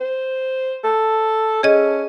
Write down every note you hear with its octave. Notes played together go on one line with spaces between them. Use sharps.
C5
A4
C#4 G#4 D#5